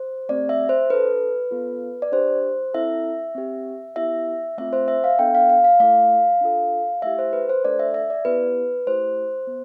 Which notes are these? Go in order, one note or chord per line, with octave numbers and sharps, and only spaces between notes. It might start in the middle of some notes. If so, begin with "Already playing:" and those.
Already playing: C5
A3 C4 G4 D5
E5
C5
D4 A4 B4
B3 F4 A4
D5
D4 G4 C5
C4 E4 A4 E5
C4 G4
B3 E4 G4 E5
A3 C4 F4 E5
C5
E5
F5
B3 D4 A4 G5
F5
F5
F5
A3 E4 A4 F5
D4 F4 A4
A3 E4 G4 E5
C5
B4
C5
A3 D4 A4 D5
E5
E5
D5
B3 E4 G4 B4
A3 E4 G4 C5
B3